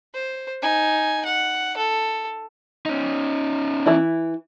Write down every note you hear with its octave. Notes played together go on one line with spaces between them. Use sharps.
C5
D#4 G#5
F#5
A4
C#4 D#4
E3 E4